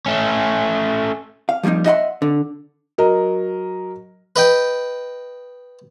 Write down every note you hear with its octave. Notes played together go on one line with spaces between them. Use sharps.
A3 C#4
F5
F3 G3 G#3 A#3 D#4
D#5 E5 F#5 A#5 C6
D3
F#3 A#4 D#5
B4 D#5 G5